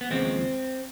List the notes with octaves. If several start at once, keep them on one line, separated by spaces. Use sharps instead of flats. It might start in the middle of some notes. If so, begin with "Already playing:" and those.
B3
D#2 C#3 F3 G#3 C4